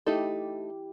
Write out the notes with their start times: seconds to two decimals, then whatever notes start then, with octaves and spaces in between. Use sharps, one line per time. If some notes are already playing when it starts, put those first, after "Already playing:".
0.06 A3 D#4 E4 G4 A4